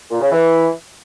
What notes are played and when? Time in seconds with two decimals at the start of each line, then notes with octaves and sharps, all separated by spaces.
0.11 A#2
0.21 C#3
0.31 E3